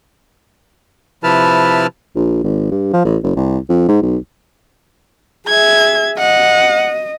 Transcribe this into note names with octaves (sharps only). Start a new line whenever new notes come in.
C3 F3 E4 B4 A5 F6
A#1
G#1
G2
F3
A1
F#1
C2
F2
G#2
B1
G#4 E5 G#6
D#5 F#5